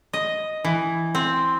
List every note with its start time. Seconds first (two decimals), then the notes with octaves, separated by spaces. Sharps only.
0.13 D#5
0.64 E3
1.15 C4